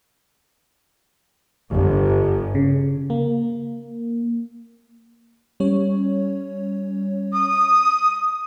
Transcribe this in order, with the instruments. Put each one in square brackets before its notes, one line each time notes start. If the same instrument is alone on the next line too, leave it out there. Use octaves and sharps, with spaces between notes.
[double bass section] G1
[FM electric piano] C#3
A#3
G3 C#4 C#5
[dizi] D#6